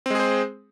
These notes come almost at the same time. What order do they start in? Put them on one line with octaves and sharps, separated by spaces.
C4 G#3 G#4 C5